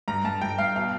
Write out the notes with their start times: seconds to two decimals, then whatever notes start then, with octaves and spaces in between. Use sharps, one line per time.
0.08 G2 A#5
0.25 G2 A5
0.41 G2 G5
0.58 G2 F5
0.76 B2 F5